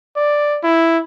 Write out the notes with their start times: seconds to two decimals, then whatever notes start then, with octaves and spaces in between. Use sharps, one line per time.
0.16 D5
0.63 E4